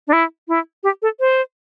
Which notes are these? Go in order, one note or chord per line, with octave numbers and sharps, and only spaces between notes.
D4
E4
E4
G4
A4
C5